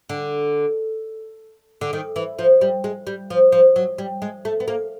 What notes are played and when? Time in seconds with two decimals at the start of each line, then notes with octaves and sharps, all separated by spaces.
0.09 D3
1.81 D3
1.93 D#3
2.16 E3
2.39 F3
2.61 G3
2.84 G#3
3.07 G3
3.30 F3
3.52 F3
3.76 F#3
3.98 G3
4.22 G#3
4.45 A3
4.60 B3
4.68 A#3